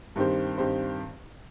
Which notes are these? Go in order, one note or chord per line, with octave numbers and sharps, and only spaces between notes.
G2 D#3 C4 G4 C5
G2 D#3 C4 G4 C5